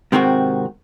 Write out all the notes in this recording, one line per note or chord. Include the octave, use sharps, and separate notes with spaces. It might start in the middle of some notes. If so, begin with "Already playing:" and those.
G#2 C3 D#3 C4 F#4